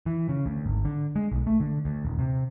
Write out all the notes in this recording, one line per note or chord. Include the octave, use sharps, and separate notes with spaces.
E3
C#3
D2
G#1
D3
G#3
B1
A3
D3
D2
D#1
C3